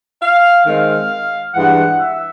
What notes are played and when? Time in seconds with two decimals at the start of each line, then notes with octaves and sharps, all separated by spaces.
0.22 F5
0.65 D#3 G#3 C4 F5
1.54 G2 E3 G#3 F#5
1.98 E5